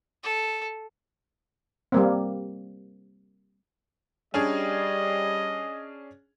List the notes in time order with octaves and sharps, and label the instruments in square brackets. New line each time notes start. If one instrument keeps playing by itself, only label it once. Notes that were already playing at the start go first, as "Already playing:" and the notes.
[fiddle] A4
[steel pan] G3 A#3 C4
[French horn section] G3 [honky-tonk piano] C#4 D4 G#4 [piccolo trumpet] D#5